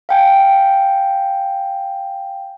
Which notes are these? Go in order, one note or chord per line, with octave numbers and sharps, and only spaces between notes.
F5 G5 G#5